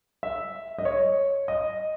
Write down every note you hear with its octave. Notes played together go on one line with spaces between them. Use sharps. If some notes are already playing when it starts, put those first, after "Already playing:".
E5
D#5
C#5
D#5